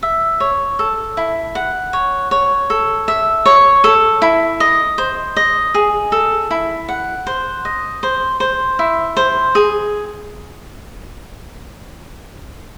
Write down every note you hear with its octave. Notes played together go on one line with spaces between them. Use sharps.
E5
C#5
A4
E4
F#5
C#5
C#5
A4
E5
C#5
A4
E4
D#5
C5
D#5
G#4
A4
E4
F#5
C5
D#5
C5
C5
E4
C5
G#4